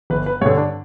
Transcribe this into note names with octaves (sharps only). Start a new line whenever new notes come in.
G1 B4
B4
G2 D3 C#5
D4